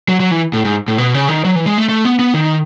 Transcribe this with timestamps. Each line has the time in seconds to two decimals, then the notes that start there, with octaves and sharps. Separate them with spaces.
0.09 F#3
0.20 F#3
0.31 E3
0.53 A2
0.65 G#2
0.88 A2
0.98 B2
1.14 C#3
1.29 D#3
1.45 F#3
1.55 E3
1.66 G#3
1.78 A3
1.89 A3
2.05 B3
2.19 B3
2.34 D#3